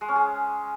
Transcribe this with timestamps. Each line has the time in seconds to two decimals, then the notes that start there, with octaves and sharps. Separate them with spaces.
0.01 G#3
0.08 C#4
0.16 G#4